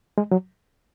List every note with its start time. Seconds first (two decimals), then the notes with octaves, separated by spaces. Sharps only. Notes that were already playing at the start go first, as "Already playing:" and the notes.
0.18 G#3
0.31 F#3